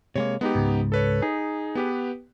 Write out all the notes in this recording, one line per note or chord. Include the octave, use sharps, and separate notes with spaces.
C3 G#3 A#3 C#5
G#3 B3 D#4 G4
C#2 G#2
A4 B4 C#5
D#4 G#4
B3 G4 B4